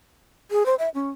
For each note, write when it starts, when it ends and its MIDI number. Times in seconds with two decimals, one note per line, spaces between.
0.51 0.66 68
0.66 0.75 72
0.79 0.89 76
0.95 1.09 61